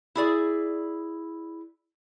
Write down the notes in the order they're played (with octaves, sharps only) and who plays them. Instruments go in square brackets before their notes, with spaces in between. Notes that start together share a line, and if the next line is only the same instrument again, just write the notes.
[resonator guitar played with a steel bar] E4 G#4 D5